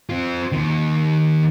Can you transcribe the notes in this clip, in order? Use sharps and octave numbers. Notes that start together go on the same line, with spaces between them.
C4 F4
D#2 D#3